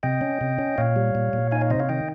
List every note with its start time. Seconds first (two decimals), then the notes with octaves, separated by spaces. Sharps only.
0.03 C3 D#5 G5
0.21 C#4
0.41 C3
0.59 C#4
0.78 A#2 C#5 F5
0.96 G3
1.15 A#2
1.33 A#2
1.51 D#4 F5 G#5
1.61 C#5 F5
1.70 C3 C5 D#5
1.80 C#5 F5
1.89 D#3 D#5 G5